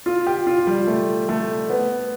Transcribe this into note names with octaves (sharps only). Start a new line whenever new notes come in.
F4
G4
F4
G3
A3
A3
B3